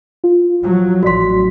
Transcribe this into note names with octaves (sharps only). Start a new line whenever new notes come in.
F4
F3 F#3
A1 F#3 F#4 D5 C6 B6